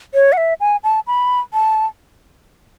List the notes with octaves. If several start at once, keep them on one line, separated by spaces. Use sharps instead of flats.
C#5
F#5
E5
G#5
A5
B5
A5